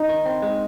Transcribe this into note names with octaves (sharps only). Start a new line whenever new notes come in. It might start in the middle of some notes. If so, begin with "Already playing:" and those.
Already playing: D#4
D#3
C4
G#3